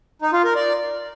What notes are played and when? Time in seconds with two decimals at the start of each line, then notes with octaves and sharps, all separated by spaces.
0.22 D#4
0.33 F4
0.44 A#4
0.56 D5